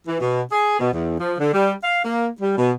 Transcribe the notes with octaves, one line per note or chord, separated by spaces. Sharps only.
E3
B2
G#4
B2
E2
F3
D3
G3
F5
A#3
G3
B2